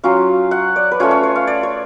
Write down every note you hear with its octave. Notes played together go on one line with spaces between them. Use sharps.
F#3 C#4 F4 F5
F#5
D5
B4
A3 C#4 F4 C#5
C#5
C#5
F5
D5
C#5